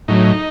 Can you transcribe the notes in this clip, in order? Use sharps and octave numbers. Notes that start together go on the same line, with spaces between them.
A2 F#3 D#4